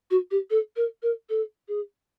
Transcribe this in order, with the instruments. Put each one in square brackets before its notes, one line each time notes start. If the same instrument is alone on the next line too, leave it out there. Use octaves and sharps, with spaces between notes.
[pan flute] F#4
G4
A4
A#4
A#4
A4
G#4